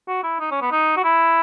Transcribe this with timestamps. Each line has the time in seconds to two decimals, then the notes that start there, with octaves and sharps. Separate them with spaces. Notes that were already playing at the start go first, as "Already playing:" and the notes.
0.08 F#4
0.23 E4
0.40 D#4
0.51 C#4
0.62 B3
0.72 D#4
0.97 F#4
1.04 E4